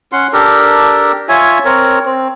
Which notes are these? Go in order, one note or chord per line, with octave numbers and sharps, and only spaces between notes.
C#4 F#5 C6
D4 G4 A4 A#4
F4 C#5 E5 G#5
C4 A#4 C#5
C4